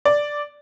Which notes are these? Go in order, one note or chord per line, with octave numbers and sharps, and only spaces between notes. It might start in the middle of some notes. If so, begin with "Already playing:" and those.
D5